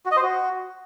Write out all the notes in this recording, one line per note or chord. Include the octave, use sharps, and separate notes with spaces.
F#4
D#5
C5
F#4